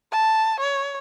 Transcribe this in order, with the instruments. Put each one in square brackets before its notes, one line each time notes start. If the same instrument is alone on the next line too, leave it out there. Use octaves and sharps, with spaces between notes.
[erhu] A5
C#5